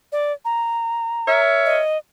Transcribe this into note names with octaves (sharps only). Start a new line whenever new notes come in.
D5
A#5
A#4 C#5 E5
D#5